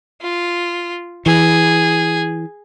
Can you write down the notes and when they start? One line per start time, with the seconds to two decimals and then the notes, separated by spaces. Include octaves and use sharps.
0.21 F4
1.26 E3 G#4